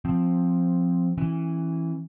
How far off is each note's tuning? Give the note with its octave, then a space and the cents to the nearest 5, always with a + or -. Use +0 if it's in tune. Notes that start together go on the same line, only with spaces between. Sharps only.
F3 +5 C4 +0
E3 +0 C#4 -30